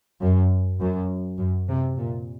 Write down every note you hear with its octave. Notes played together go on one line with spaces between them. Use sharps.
F#2
F#2
F#2
C3
A#2